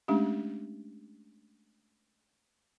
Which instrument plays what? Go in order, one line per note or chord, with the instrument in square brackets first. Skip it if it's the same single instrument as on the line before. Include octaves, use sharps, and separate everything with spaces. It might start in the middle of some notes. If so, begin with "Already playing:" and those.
[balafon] G#3 A3 C#4 D4 G4